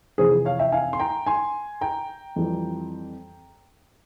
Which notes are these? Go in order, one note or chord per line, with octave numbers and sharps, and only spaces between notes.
F2 C3 E3 G#4 C5
C#5 F5
E5 G5
F5 G#5
C6
G5 A#5
G#5 C6
G5 A#5
F2 E3 G3